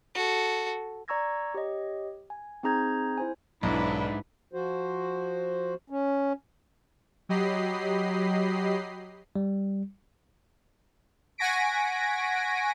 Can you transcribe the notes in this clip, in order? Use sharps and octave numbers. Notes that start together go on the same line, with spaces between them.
F#4 A4
D5 A#5 C#6 E6 G#6 A#6
G4 C#5 D#5
G#5
C4 D#4 G#4 A#5 G6 G#6
E4 C5 G#5
B1 G#2 D4 E4 B4
F3 F#4 C5
C#4
F#3 G4 D#5 B5 C7
G3
F#5 G#5 C#6 A#6 B6 D7